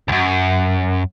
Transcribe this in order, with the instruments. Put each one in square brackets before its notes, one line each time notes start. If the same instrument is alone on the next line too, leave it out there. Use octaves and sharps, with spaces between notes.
[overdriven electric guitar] C#2 F#2